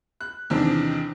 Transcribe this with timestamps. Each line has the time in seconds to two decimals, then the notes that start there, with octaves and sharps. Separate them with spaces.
0.21 F#6
0.50 E2 C3 D#3 C4 D4